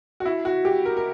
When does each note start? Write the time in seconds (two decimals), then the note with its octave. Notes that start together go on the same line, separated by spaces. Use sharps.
0.20 F#4
0.25 E4
0.45 F#4
0.65 G4
0.85 A#4
0.97 A#4